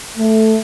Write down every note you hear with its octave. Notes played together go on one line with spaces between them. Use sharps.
A3